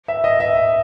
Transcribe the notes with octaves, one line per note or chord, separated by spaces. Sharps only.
E5
D#5
E5